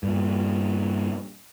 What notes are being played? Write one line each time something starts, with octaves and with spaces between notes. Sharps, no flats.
G2 A#2